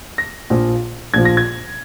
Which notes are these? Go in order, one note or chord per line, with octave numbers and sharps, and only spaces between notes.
A#6
A#1 A#2 F3
A#1 A#2 F3 G#6
A#6
G#6